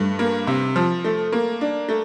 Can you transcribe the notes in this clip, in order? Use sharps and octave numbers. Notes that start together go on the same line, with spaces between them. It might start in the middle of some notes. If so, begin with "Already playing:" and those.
Already playing: G2 A3
A#3
C3
F3
A3
A#3
D4
A3